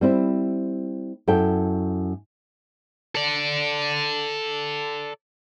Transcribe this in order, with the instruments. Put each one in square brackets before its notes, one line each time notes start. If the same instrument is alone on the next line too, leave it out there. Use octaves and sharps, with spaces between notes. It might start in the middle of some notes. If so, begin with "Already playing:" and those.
[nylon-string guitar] G3 C4 E4
F#2 E4 A4 G5
[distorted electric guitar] A4 D5